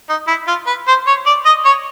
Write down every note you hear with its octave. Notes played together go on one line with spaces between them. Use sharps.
D#4
E4
F4
B4
C5
C#5
D5
D#5
C#5